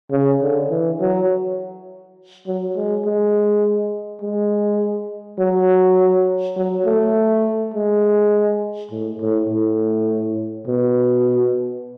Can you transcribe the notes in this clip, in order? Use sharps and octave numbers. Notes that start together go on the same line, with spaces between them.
C#3
D3
E3
F#3
F#3
G#3
G#3
G#3
F#3
F#3
A3
G#3
A2
A2
A2
B2